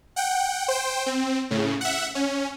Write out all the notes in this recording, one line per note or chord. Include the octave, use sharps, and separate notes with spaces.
F#5 G5
C5 G5
C4
A2 C#3
E5 F#5
C#4